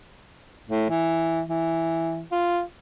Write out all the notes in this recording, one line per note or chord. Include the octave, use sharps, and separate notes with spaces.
A2
E3
E3
F4